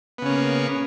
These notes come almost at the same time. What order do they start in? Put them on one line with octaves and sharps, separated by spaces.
B3 C#3 C#4 A#3